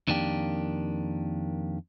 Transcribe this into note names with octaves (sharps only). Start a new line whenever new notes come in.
F2 D#3 A#3 D4 G4